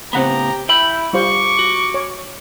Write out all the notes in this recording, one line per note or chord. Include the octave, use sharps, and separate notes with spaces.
A2 C#3 B3 C4 G4 F#5 A#5 B5
E4 E5 G5 B5 G6
G3 F4 C5 C#6 D6
F#4
C#5